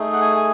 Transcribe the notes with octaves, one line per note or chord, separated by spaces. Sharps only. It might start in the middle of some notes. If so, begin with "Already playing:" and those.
Already playing: A3 D#4 G#4
F#5
G#5
G#5